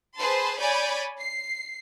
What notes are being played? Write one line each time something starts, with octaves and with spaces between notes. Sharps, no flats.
G#4 B4 C5 A5 C6
C#5 D5 G#5 B5 G6 A6
C7